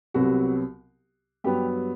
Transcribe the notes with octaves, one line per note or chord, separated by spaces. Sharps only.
C2 C3 F#3 B3 F#4
G2 F#3 B3 G4